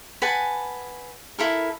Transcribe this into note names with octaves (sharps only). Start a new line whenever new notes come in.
B4 F#5 G#5 A5
E4 A4 A#4